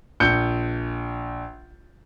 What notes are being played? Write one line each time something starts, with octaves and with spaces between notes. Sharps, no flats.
A#1 G6 C#7